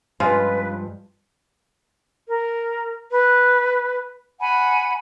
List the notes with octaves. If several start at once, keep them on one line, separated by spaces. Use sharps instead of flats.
G2 C#3 F3 G#3 F4 B4
A#4
B4
F#5 G#5 B5